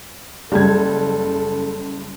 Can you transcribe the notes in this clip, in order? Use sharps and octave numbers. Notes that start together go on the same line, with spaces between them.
F#1 C#3 G3 A4 G#6